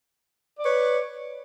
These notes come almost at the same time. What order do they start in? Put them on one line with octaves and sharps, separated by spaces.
D5 C#5 B4